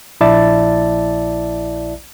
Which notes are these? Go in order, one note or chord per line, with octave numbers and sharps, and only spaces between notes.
A#1 E4 D5 E5 A5 A6